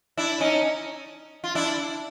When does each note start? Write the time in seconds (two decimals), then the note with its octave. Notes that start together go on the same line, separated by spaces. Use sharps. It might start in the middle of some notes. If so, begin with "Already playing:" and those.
0.17 D4 E4
0.40 C#4 D#4
1.44 F4
1.55 D4 E4